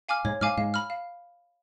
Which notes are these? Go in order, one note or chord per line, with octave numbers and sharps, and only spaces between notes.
F5 G#5 D6 F6
G#2 G#3 C#5
G#2 G#3 F5 G#5 D6 F6
G#2 G#3 F5
B5 F6
F5